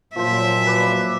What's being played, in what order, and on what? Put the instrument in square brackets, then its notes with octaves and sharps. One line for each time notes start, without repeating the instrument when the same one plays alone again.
[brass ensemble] A#2 F#3 [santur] F3 C5 [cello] E5
[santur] B4 D5